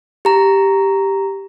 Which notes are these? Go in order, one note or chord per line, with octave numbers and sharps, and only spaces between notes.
G4 A#5